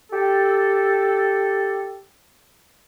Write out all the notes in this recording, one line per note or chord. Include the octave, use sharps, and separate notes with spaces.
G4 A4